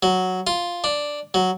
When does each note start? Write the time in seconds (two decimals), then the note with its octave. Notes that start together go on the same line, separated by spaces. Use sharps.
0.03 F#3
0.47 F4
0.84 D4
1.34 F#3